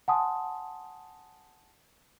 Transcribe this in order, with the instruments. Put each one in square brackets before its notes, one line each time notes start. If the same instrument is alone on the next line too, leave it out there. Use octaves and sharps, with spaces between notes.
[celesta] F#5 G#5 A5 C6 D#6